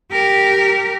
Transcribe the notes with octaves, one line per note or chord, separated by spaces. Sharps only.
G4 A#4